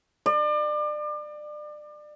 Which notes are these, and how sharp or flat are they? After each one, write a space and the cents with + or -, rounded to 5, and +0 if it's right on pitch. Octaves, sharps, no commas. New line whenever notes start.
D5 +30